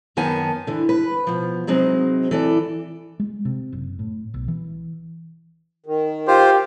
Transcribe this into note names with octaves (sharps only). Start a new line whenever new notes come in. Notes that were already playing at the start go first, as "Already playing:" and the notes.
F#2 D#3 B3 G#5 A5
D3 E3
B4
B2 F3
C3 F#3 G#3 C4 D#4
E3 A4 D5
G#3
C3
F#1
A2
B1
E3
D#3
F4 G4 C5